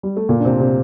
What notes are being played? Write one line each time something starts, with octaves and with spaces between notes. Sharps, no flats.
G3
A3
A#2 A#3
D4
C3 C4
C3 C4